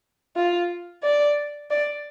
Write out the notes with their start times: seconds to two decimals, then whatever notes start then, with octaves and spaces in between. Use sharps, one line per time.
0.36 F4
1.04 D5
1.71 D5